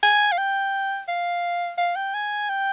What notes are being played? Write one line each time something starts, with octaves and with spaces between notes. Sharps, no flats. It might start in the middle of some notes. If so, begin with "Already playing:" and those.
G#5
F5
G5
F5
F5
G5
G#5
G5